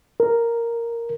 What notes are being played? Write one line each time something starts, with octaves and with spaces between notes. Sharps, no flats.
A#4